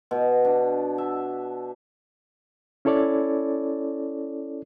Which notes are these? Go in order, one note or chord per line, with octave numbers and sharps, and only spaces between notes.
B2
D4
E5
C#4 E4 A4 C#5 D5